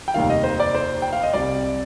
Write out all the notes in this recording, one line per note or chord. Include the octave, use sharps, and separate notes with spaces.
G5
F1 D#2 D#3 G3 F5
D#5
C5
D5
C5
G5
F5
D#5
C2 C3 G3 D5